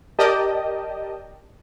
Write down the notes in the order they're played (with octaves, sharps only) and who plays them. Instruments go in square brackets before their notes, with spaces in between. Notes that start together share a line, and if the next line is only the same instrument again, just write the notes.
[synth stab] G4 A#4 D5 D#5 G5 A5